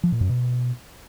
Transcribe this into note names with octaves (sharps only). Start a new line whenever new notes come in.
F3
A#2
F#2
B2